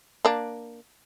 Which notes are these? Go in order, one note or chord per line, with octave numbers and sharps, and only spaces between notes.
A#3 D4